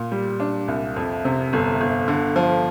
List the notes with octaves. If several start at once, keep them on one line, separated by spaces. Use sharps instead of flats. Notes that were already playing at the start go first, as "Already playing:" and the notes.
Already playing: A#2
G3
D4
C2
F2
C3
G1
G1
D3
F3